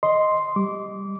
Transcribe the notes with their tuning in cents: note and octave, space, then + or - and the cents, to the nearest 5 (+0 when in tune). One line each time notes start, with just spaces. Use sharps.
D#5 +0 C6 +0
G3 +5 D6 -25